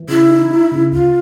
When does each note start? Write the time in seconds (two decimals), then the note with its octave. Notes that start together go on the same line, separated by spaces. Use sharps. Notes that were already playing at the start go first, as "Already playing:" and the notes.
Already playing: E3
0.08 C#3 E4
0.29 D#4
0.50 D#4
0.72 C#3
0.92 D2 F4